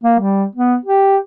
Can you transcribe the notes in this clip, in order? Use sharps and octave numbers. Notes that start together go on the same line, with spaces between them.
A#3
G3
B3
G4